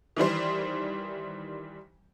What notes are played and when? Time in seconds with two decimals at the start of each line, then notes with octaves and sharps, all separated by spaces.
0.16 D#3 E3 G3 C5